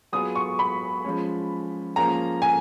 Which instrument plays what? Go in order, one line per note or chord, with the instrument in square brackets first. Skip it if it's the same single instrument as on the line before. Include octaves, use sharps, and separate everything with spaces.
[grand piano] F#3 B3 F4 G#4 [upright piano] D#6
[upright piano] C#6
B5
[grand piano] F3 G#3 C#4
[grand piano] F3 A#3 C#4 G#4 [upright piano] A#5
[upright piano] G#5